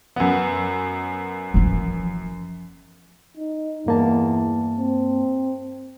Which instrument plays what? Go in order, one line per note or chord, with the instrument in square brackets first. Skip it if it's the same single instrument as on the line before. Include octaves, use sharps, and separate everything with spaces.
[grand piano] F#2 B3
[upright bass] E3 F3
[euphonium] D#4
[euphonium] E2 [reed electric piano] G2 A#3 A5
[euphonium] C4